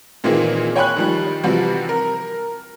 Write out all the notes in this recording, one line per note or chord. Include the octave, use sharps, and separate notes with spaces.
A#2 D#3 E3 A#3 C4 G#4
C#5 G5 G#5 B5 C#6 F#6
D#3 F3 G3
C3 E3 F3 G3 C4 F#4
A#4